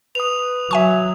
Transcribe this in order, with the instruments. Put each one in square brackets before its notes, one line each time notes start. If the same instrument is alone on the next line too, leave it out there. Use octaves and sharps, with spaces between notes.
[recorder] B4 [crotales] D#6 F7
[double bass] F#3 [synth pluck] E5 G#5 C#6